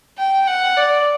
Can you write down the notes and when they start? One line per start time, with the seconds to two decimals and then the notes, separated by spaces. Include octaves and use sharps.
0.18 G5
0.47 F#5
0.77 D5